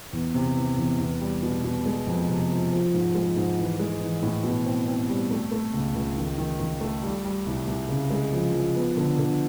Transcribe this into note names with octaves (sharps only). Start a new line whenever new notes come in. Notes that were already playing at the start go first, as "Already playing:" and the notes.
E2
C3
E3
E2
E2
G3
B2
B2
G#3
F2
C3
F3
F3
G#2
G#3
G#2
E3
G#3
E3
A2
B2
C4
C4
G3
A3
A3
C#2
C#2
D#3
D#3
D#3
A3
G3
G3
C2
C2
C#3
G#3
F3
F3
B3
D3
D3